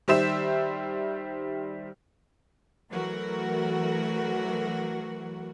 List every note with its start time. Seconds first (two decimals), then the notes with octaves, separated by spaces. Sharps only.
0.08 D#3 G3 C5 E5 E7
2.91 E3 F#3 A3 F#4 A#4